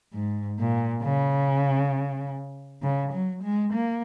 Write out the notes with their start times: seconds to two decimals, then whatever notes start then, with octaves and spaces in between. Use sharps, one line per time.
0.13 G#2
0.59 A#2
1.03 C#3
2.83 C#3
3.12 F#3
3.43 G#3
3.73 A#3